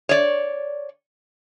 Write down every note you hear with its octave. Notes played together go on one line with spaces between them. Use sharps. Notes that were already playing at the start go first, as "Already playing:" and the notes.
C#5 D5